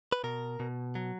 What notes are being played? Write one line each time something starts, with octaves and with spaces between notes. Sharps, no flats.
B4
B2 A#4
B2
F#3